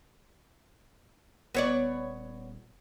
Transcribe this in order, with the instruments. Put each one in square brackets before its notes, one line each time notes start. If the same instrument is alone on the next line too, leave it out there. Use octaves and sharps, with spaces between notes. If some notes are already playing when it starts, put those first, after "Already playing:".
[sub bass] D#1 [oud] B3 C#5 D5